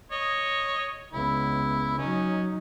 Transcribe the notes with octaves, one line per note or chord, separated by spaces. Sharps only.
C#5 D#5
C#2 B3 E4
F#3 C#4 D#4